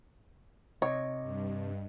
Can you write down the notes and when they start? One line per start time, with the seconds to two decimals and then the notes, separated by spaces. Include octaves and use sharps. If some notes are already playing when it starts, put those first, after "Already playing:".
0.82 C3 C#5 D#5
1.22 G2